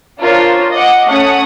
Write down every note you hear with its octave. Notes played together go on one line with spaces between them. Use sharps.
D4 F4 A#4 C5 C#5
D#5 F#5 D6
A3 C#4 F#5 D#6